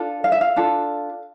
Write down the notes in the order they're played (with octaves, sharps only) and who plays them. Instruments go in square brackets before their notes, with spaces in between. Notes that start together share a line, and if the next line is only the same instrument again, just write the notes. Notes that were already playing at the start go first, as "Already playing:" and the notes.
Already playing: [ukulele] D4 F4 A4
F5
E5
F5
D4 F4 A4